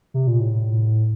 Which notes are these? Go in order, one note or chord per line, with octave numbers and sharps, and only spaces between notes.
C3
A#2
A2